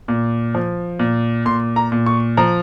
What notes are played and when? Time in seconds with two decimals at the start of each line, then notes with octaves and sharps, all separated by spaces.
0.08 A#2
0.55 F3
0.99 A#2
1.45 A#2 C6
1.76 A#5
1.92 A#2
2.06 C#6
2.37 F3 A#5